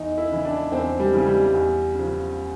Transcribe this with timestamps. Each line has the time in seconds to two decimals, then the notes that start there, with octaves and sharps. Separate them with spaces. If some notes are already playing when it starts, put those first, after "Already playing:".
Already playing: E2 D#4
0.18 E4
0.31 C#3 E3
0.45 D4
0.72 E2 C4
1.00 G3
1.13 C#3 E3
1.26 G3
1.54 E2
1.95 C#3 F3